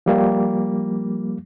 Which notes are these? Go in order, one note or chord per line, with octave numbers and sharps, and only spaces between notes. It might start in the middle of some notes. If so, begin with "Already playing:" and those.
F3 G3 A#3